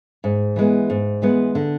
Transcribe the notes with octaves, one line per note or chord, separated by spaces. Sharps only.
G#2
E3 G#3 B3
G#2
E3 G#3 B3
D3